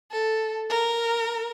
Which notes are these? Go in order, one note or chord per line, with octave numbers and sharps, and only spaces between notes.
A4
A#4